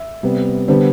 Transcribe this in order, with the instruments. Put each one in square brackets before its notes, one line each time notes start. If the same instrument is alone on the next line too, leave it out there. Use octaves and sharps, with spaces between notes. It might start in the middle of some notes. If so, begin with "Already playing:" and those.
Already playing: [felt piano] E5
C3 G3 B3
D3 G3 B3 C5